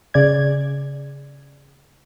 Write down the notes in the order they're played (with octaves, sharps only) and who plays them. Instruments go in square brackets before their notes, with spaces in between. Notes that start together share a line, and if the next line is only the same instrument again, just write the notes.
[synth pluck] C#3 D5 G#6